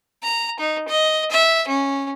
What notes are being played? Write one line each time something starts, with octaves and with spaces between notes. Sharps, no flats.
A#5
D#4
D#5
E5
C#4